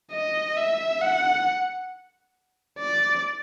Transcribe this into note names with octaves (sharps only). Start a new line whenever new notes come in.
D#5
E5
F#5
D5